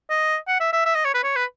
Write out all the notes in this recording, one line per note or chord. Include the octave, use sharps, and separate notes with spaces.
D#5
F#5
E5
E5
E5
D#5
C#5
B4
C#5
B4